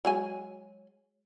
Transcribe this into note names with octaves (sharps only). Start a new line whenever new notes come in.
F#3 G#3 G#5